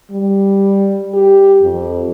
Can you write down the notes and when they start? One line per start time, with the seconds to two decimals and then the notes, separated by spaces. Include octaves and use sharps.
0.11 G3
1.14 G4
1.62 F2